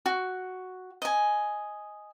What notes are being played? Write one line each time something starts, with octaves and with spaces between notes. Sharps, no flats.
F#4
D#5 G#5